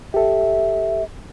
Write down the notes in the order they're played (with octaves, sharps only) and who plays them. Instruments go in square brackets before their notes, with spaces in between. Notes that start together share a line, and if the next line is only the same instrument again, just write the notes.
[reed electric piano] G4 A4 [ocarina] E5